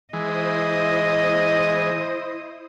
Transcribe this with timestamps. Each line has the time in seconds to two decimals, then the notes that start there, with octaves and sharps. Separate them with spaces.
0.13 E3 G#3 E4 C5 D#5 D#6